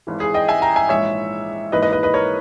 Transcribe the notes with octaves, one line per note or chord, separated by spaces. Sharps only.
G#1 G#2 E3
G#4
D#5 G5
E5 G#5
G5 A#5
E5 G#5
A#1 G#2 E3 G#3 C#5 E5
G#1 G#2 E3 A#3 D#4 B4 D#5
B4 D#5
B4 D#5
B4 D#5
A#4 C#5